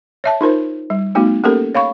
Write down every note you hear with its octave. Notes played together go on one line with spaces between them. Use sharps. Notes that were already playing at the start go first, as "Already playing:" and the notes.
C#5 E5 A5
D#4 F4 A#4 C5
G3
A3 B3 D#4 F#4
A#3 C#4 G4 A4 A#4
C#5 F5 B5 C#6